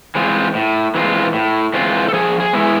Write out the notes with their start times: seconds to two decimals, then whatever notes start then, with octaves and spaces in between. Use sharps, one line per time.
0.15 E3 G#3 C4 F4
0.55 A2
0.95 E3 G#3 C4 F4
1.34 A2
1.74 E3 G#3 C4 F4
2.09 A4
2.13 F3 G#4
2.40 G#4
2.53 G#3 B3 E4